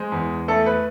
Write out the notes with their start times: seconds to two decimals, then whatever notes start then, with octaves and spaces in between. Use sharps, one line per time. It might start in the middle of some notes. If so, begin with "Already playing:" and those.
Already playing: G#3 C5
0.12 E2
0.48 A3 A4
0.66 B4